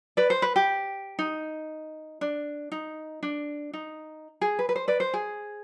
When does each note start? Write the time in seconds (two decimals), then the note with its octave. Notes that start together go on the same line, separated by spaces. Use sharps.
0.17 B4 D5
0.30 C5
0.42 B4
0.56 G4
1.19 D#4
2.21 D4
2.72 D#4
3.23 D4
3.73 D#4
4.41 G#4
4.59 B4
4.69 B4
4.76 C5
4.88 B4 D5
5.00 C5
5.14 G#4